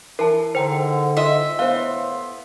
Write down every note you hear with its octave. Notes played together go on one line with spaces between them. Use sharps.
E3 A#4 A5
G#2 D3 C5 G5 A#5
F4 D#5 E5
A2 B3 E4 C5 F5 C6